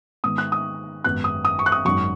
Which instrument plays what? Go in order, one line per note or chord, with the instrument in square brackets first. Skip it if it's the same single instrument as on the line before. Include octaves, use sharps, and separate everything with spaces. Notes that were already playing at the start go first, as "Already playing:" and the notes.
[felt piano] G#2 D#3 B3 D#6
F#6
D#6
G#1 F#2 F#3 B3 F#6
D#6
D#6
C#6
F#6
D#6
G#1 F#2 D#3 F#3 C#6